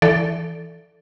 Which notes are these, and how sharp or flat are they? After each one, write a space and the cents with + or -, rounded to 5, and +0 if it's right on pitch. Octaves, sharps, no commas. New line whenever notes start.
E3 +10 A4 +0 D5 +0